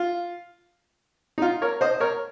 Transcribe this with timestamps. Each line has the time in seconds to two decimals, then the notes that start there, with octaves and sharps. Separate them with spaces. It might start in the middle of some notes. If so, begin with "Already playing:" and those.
Already playing: F4
1.38 D#4
1.42 F4
1.62 A#4 C#5
1.81 C5 D#5
2.00 A#4 C#5